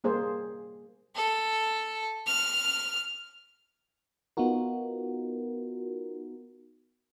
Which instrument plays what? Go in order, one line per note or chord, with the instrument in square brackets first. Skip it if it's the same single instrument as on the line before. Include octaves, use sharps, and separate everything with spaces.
[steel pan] G3 A#3 G#4 C5
[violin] A4
F6
[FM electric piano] B3 D#4 F4 F#4 A#4